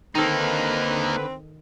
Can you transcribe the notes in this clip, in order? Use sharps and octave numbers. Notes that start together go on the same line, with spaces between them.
D3 D#3 A#3 C4 D#4 A4 B4